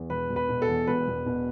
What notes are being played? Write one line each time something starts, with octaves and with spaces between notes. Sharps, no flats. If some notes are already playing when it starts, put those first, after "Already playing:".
Already playing: E2
E1 B4
E1
B4
B2
A4
E2
E1 B4
E1
B2